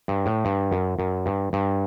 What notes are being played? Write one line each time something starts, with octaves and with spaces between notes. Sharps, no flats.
G2
A2
G2
F#2
F#2
G2
G2